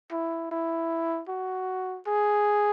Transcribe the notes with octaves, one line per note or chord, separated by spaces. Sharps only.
E4
E4
F#4
G#4